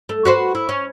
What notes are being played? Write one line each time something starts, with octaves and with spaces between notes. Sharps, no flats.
A3
F#4 B4 C5
E4
C#4